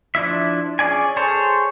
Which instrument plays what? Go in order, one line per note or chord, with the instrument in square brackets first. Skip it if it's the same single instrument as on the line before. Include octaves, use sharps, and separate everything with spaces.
[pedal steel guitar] F3 D4 E4 E5
C#4 G#4 D5 G#5
G#4 A4 C5 C#5